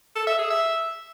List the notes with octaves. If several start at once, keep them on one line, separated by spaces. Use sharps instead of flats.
A4
E5
G#4
E5